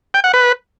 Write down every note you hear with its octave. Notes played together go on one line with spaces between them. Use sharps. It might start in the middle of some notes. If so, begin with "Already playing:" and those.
G5
F#5
B4